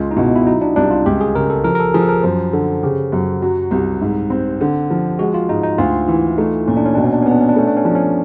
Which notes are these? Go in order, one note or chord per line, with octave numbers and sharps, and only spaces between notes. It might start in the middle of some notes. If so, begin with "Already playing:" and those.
Already playing: C#2 F4
D#4
B2 E4
E4
F#3 D#4
D4
C2 D4
F4
C#2 G4
G#4
C#3 A#4
A4
F3 A#4
A#4
A4
F3 G#4
A4
A#4
F#2 C5
D3 A4
C#3 G4
F#2
F#3
C2
G#2
C4
D3
F3
G#3 F#4
F4
G#2 D#4
D#4
D2 F4
E3 E4
A3 D#4
A#2 C#4
D4
C#4
B2 D4
C#4
D4
B3 C#4
D4
C#4
D4
A3 C#4
D4
C#4
F3 D4
C#4